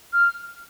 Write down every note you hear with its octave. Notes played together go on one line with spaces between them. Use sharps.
F6